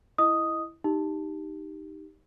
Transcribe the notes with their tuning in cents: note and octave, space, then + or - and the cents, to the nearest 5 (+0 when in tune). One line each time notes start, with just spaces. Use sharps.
E4 +0 D#5 +0 D#6 +0
D#4 +0 G4 +0